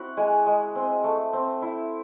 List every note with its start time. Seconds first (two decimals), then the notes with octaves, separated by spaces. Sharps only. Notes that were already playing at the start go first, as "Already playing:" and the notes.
Already playing: C4 E4 F#4 F#5
0.17 G#3 G#4 G#5
0.46 G#3
0.75 C4
1.04 A3
1.33 C4
1.62 E4